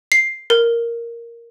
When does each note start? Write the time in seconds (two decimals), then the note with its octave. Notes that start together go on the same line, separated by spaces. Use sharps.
0.12 C7
0.50 A#4